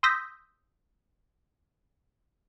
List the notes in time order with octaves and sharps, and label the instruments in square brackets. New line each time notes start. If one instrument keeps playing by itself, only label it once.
[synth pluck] C6 D#6 E6 G6 A#6 B6